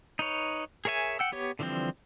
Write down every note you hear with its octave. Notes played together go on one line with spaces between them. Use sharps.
D#4 B4 C#5
G#4 A#4 C#5 E5 G#5
F#5 G5 E6
B3 G4 C#5
D3 E3 F3 G3 C4